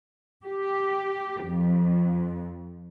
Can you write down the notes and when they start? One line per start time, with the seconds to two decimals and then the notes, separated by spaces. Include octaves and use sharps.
0.44 G4
1.44 F2